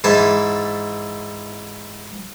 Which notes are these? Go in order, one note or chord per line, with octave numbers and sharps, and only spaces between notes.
G#2 E3 E4 A5